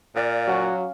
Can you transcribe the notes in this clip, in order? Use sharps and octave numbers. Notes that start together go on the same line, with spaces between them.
A#2 D5 F5
F#3 C#4 F#4